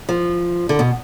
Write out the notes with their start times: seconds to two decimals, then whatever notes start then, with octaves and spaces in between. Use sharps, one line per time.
0.09 F3
0.69 D3
0.79 B2